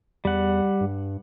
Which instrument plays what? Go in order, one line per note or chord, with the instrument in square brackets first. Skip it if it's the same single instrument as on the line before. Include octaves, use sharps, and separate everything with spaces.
[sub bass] E2 [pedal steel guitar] G3 F#5
[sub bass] G2